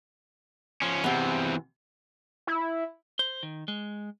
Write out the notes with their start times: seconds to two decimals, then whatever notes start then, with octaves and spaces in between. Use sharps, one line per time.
0.82 F3 C#4
1.04 E2 C3 E3 C4
2.47 E4
3.19 C5
3.43 D#3
3.68 G#3